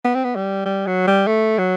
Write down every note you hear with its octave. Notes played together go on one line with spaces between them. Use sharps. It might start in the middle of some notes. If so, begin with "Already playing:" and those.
B3
C4
B3
G3
G3
F#3
G3
A3
F#3